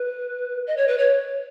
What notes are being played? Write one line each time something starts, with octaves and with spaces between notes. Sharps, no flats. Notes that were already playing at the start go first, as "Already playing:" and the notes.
Already playing: B4
D#5
C#5
B4
C#5